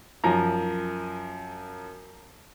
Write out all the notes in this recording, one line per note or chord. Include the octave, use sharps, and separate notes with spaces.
F#2 F3 A#5